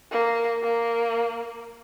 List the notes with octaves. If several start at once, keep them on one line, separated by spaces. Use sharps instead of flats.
A#3
A#3